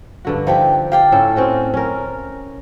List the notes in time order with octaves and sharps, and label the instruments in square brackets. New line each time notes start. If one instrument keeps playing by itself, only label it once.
[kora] G2 D3 F#4
[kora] F3 [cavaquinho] D#4 G4 E5
[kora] G4 [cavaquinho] F5 G5 A5
[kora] A2 C#4 A4
C4 C#4 F#4
C#4 A#4